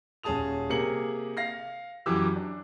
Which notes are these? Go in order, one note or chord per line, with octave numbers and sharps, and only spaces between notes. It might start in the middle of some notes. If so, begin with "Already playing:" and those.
D#1 C#4 G#4 A5 D#6 F7
C3 A#3 G4 G#4 C#7 F#7
F5 A#6 C7
F#2 E3 G4 D6 E6
D4